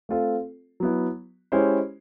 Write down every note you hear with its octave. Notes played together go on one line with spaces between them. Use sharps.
A3 C4 F4 A4
F#3 B3 E4
G#3 C#4 E4 G4 C5